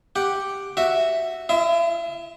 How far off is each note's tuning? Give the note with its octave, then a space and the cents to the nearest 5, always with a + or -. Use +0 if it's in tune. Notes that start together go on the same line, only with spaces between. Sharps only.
G4 +0 F#5 +0
F#4 +0 E5 +0
E4 +45 E5 -25